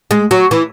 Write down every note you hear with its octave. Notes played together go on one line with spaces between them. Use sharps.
G#3
F#3
E3